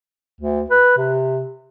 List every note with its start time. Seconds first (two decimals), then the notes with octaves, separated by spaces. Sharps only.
0.41 D2
0.70 B4
0.97 C3